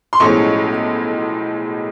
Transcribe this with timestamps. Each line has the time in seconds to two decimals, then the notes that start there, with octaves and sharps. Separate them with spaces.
0.13 C6
0.20 B1 A2 F3 G#3 C#4 C#6